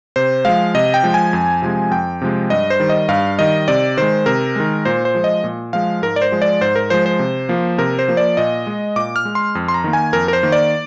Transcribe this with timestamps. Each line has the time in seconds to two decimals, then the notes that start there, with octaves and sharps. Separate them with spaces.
0.16 C3 C5
0.45 F3 G#3 F5
0.74 C3 D#5
0.94 G5
1.03 F3 G#3
1.14 G#5
1.33 F2
1.62 C3 F3 G#3
1.91 F2 G5
2.21 C3 F3 G#3
2.50 G2 D#5
2.70 C5
2.80 D#3 G3
2.89 D#5
3.09 G2 F5
3.38 D#3 G3 D#5
3.68 C3 D5
3.97 D#3 G#3 C5
4.26 C3 A#4
4.56 D#3 G#3
4.85 A#2 C5
5.05 C5
5.15 F3 G#3
5.24 D#5
5.44 A#2
5.73 F3 G#3 F5
6.02 G#2 A#4
6.16 D5
6.22 C5
6.32 F3 G#3
6.42 D5
6.61 G#2 C5
6.76 A#4
6.90 F3 G#3 C5
7.06 C5
7.19 C3
7.49 F3 A#3
7.78 C3 A#4
7.99 C5
8.08 F3 A#3
8.17 D5
8.37 A#2 D#5
8.67 G#3
8.96 A#2 D6
9.16 F6
9.25 G#3
9.35 C6
9.55 F2
9.68 C6
9.74 A#5
9.84 D#3 A#3
9.93 G#5
10.13 F2 A#4
10.28 A#4
10.33 C5
10.43 D#3 A#3
10.52 D5